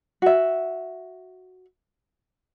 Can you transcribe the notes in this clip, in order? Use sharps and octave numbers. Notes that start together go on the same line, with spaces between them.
F#4 E5